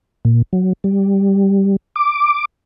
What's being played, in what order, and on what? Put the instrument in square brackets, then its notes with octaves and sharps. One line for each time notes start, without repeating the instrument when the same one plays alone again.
[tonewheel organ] A#2
F#3
G3
D6